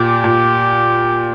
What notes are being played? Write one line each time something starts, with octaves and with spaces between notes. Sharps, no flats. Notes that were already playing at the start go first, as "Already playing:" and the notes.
Already playing: A#2 G4
A#2